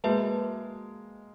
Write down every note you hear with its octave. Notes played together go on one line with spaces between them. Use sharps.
G#3 A#3 F#4 B4 E5 A5